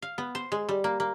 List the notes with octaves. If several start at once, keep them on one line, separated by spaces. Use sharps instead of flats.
F5
B3
C5
G#3
G3
A#3
A#3